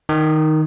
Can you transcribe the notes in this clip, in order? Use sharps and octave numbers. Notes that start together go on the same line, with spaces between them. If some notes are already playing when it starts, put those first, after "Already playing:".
D#3